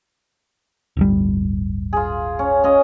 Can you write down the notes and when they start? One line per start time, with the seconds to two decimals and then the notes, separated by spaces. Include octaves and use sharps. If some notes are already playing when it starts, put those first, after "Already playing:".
0.97 D1 G1 G3
1.93 F4 G#4
2.39 C#4
2.64 C#4 F4 D#5